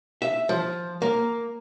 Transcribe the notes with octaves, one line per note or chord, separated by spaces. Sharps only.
E5
F3
A#3